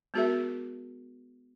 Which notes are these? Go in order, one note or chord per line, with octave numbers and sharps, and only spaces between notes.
G#3 B3 F#4 G#4 A#4 E5